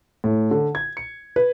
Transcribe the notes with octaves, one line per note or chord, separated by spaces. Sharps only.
A2
D3
G#6
C#7
B4